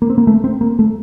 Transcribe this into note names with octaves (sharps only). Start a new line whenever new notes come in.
A#3
C4
A#3
A3
C4
A#3
A3